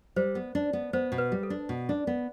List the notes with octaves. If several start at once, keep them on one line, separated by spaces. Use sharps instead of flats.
G3 C5
B3
D4
B3
B3 C5
B2
B4
G3
A4
D4
B2
D4
B3